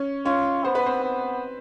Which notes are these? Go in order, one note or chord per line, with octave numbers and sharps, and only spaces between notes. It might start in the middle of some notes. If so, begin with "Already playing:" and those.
Already playing: C#4 C#5
C#4 F4 C#5
B3 C5
B4
C4 C5
B3